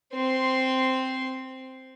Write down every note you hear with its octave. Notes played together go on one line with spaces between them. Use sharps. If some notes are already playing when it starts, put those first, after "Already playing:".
C4 C6